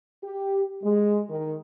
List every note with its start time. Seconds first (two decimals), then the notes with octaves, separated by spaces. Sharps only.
0.23 G4
0.83 G#3
1.29 D#3